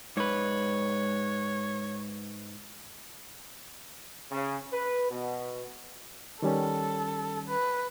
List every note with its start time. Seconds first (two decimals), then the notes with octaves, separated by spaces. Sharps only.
0.17 G#2 B4 C#5
4.31 C#3
4.73 B4
5.10 B2
6.42 D#3 G3 C#4 A4
7.48 B4